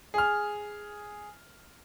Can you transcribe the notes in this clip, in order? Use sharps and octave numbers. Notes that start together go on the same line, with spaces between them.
G#4 F6